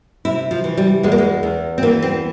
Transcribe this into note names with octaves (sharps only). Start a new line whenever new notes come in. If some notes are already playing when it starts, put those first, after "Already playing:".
C3 E4
F3
E3
G3
E2 G#3
A#3
G#3
E2
C4
E3 A#3
C4